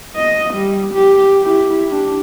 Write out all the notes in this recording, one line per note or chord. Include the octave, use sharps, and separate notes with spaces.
D#5
G3
G4
E4 G4
D4 G4